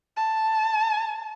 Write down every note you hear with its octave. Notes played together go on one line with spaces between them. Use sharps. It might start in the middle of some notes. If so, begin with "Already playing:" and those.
A5